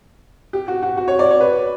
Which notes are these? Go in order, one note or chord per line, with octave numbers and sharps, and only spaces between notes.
G4
F#4
F#4
F#4
C#5
D5
C#5
B4